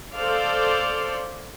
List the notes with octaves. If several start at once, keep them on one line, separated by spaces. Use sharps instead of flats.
A4 C5 D5 F5